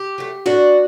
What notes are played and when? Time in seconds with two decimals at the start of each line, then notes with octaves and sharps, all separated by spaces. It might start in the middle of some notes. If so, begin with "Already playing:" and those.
Already playing: G4
0.18 F#3 A3
0.46 A2 D4 F#4